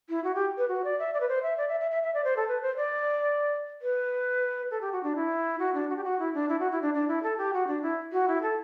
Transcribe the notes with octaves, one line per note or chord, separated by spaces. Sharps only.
E4
F#4
G4
B4
F#4
D5
E5
D5
B4
C5
E5
D5
E5
E5
E5
E5
D5
C5
A4
B4
C5
D5
B4
A4
G4
F#4
D4
E4
F#4
D4
F#4
G4
F#4
E4
D4
E4
F#4
E4
D4
D4
E4
A4
G4
F#4
D4
E4
F#4
E4
A4